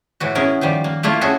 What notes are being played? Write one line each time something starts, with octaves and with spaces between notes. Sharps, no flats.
A2 E3 F#4
B3 C#4 E4 G#4 A#4
D#3 F3 G3
A#3
A3 A#3 E4 F4
C#4 E4 F#4 G#4 A4